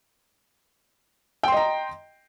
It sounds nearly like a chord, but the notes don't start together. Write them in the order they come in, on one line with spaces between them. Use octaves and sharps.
G5 C6 D#5 A#5